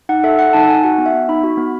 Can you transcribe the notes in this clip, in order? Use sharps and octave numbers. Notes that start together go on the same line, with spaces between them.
D#4 F#5
A4 E5
A4 F#5
D#4 A5
D#4 G#5
F#4 F#5
B3
E5
B3
D#4 B5
F#4
B3